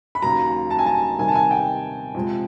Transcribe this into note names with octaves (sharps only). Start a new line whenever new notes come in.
B5
D#2 C#3 F#3 A#5
A5
G#5
A5
C3 D#3 G3 G#5
A5
G#5
G5
F2 C3 F3 G#3